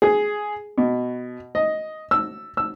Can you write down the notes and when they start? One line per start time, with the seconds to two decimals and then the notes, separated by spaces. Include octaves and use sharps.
0.02 G#4
0.78 B2
1.55 D#5
2.11 E6
2.57 E6